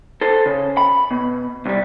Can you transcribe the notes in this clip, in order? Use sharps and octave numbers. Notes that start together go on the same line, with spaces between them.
A4 C5
C#3
B5
B2
C2 G3